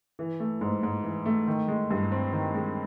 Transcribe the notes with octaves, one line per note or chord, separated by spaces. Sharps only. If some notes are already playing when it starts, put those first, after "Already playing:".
E3
A3
G#2
G#2
E3
A3
D#3
G#3
G2
C4
D#3
G#3